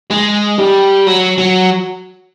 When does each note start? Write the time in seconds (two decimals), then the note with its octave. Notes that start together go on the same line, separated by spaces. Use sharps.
0.11 G#3
0.59 G3
1.06 F#3
1.38 F#3